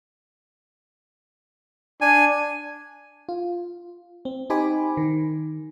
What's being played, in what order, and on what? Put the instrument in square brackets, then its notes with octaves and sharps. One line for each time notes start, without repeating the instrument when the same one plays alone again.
[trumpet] D4 [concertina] G#5
[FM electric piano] F4
C4
D#4 G4 C5 G#5 B5 D6
D#3